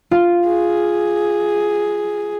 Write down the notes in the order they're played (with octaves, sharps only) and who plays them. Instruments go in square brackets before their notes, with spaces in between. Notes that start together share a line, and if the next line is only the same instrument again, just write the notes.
[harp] F4
[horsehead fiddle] G#4